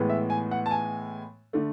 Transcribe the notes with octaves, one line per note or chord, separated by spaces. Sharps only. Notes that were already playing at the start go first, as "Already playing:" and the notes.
Already playing: A2 E3 G#3 B3
E5
G#5
F#5
A5
G#5
D3 A3